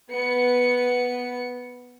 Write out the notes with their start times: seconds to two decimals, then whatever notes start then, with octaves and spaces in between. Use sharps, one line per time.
0.11 B3 C#7